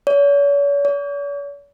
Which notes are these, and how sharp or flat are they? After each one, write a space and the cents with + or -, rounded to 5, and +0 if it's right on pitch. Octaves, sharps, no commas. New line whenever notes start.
C#5 +40
C#5 +45